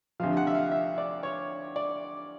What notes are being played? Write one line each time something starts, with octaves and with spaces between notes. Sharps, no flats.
D2 C3 F3 F5
F#5
E5
F5
E5
D5
C#5
D5